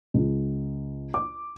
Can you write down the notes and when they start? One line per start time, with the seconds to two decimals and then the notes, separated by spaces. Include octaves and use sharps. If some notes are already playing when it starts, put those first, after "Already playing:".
0.14 C#2
1.14 D6